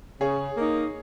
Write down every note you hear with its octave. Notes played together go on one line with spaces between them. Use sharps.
C#3 G#4 C#5
A#3 D#4